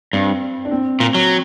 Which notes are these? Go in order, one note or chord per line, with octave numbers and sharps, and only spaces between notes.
G2 C4
D4
C4
A#2
F#3